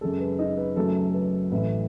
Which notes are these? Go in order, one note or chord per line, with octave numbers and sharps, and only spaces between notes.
F#2 C#3 G#3 A4
B4
D#4 D#5
B4
F#2 C#3 F#3 A3 A4
A4
B4
A1 A2 E3 A3 B4